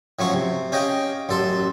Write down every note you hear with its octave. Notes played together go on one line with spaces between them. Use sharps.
A2 F3 F#3 C#4 C#6
C3
C#4 G4 D#5 F5 G5
A1 F#2 A4 A5 C6